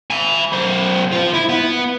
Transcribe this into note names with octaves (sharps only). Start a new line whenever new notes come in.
G#5 B5
B1 C5
F4 C5
E4
B3 B4